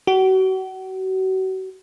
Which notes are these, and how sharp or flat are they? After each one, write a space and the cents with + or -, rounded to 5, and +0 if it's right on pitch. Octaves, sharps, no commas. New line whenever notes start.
F#4 +35